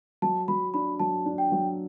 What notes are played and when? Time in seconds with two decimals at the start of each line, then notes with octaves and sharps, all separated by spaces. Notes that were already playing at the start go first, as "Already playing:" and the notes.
0.22 F#3 A5
0.48 F#3 B5
0.74 D4 B5
1.00 F#3 A5
1.26 D4
1.38 G5
1.52 F#3